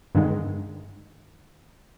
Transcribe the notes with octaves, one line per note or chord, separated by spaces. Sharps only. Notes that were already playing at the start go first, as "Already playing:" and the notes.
G2 D3 D#3 G#3